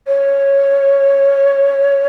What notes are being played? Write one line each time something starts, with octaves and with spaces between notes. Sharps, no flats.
C#5